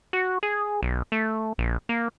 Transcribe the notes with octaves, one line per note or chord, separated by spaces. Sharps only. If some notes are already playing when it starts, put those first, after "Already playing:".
F#4
G#4
B1
A3
A#1
A#3